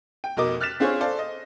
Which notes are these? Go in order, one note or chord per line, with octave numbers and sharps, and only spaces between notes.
G5
F1 B2 A#4 D#5 D6
F6 F#6 A6 B6 E7
C4 D4 F4 G#4 C5 C#5
A4 C5 D5 F5
D#5